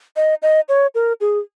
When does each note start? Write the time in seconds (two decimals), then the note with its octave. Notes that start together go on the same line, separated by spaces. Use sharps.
0.16 D#5
0.42 D#5
0.69 C#5
0.95 A#4
1.21 G#4